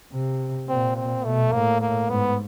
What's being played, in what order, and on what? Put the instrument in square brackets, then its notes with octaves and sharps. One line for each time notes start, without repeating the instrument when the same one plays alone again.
[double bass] C3
[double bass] A#2 [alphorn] C4
[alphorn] C4
[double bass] B2 [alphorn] A3
[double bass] A2 [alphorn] A#3
[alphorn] A#3
[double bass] G#2 [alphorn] B3